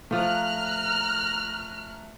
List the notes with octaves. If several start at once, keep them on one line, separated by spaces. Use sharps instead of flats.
F3 A3 F4 A#5 F6 F#6